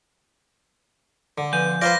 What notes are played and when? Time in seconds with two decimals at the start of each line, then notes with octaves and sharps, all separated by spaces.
1.38 D3
1.53 F3 B3 G#5 G6
1.82 F4 B4 C5 D5 A#6